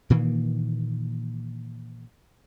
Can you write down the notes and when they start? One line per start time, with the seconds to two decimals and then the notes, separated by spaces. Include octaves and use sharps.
0.10 A#2 D#3 E3 A#3